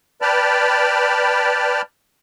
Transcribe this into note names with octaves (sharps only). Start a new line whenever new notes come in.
B4 D5 G5 A5 B5 F6